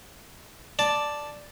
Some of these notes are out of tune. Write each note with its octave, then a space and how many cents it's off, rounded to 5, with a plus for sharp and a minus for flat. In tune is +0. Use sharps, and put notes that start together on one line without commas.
D5 +0 A5 +0